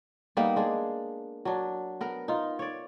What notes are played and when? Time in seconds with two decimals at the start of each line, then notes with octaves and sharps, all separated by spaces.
0.37 G3 A#3 B3 D#4
0.56 G#3 D4 G#4
1.45 F#3 D4
2.01 B3 A#4
2.28 D#4 F4
2.59 C#5 D5